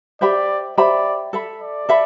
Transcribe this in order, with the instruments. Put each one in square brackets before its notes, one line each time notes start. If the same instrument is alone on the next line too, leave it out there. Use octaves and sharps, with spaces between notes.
[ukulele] G4 C5 E5 B5 [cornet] D5
[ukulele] G4 C5 E5 B5 [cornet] D5
[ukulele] A4 E5 B5
[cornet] D5
[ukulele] A4 E5 B5